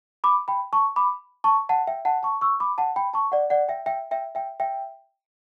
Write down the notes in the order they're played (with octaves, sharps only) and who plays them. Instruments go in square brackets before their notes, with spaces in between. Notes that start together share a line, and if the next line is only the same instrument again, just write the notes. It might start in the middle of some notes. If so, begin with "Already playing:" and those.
[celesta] B5 D6
G5 B5
A5 C#6
B5 D6
A5 C#6
F#5 A5
E5 G5
F#5 A5
A5 C#6
C#6 E6
B5 D6
F#5 A5
G5 B5
A5 C#6
D5 F#5
D5 F#5
E5 G5
E5 G5
E5 G5
E5 G5
E5 G5